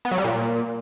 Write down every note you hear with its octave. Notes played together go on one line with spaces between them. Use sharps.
B3
F#3
G3
A#2